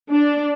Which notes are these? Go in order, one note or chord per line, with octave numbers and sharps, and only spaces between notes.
D4